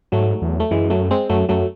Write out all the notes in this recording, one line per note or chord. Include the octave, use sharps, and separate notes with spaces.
G#2 F#3 A3
E2
A3
F#2 E3 G#3
F#3 A3
G#3 C4
F#2 F#3 A3
F#2 F#3 A3